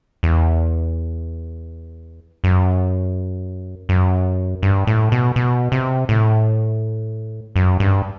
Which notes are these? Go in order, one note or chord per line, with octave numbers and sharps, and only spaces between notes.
E2
F#2
F#2
G2
A2
B2
B2
C3
A2
F#2
G2